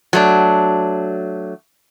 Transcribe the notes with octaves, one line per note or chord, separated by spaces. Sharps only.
F#3 A3 D4